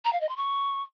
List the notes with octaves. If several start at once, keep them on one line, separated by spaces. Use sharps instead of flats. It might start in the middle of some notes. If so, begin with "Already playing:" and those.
A#5
F5
D#5
C6
C#6